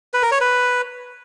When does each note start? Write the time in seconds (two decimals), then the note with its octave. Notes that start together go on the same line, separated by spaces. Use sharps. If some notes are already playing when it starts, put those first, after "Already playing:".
0.14 B4
0.23 A#4
0.32 C#5
0.40 B4